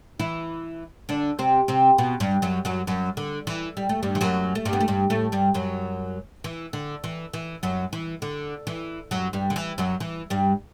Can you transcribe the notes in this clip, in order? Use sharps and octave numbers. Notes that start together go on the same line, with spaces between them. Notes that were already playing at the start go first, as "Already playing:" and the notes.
E3 E4
D3 D4
C3 C4
C3 C4
B2 B3
G2 G3
F#2 F#3
F#2 F#3
F#2 F#3
D3
E3
G3
A3
G2 G3
E3
F#2 F#3
A3
G2 G3
B3
A3
G2 G3
A2 A3
G2 G3
F#2 F#3
E3
D3
E3
E3
F#2 F#3
E3
D3
E3
F#2 F#3
G2 G3
D3
E3
F#2 F#3
E3
G2 G3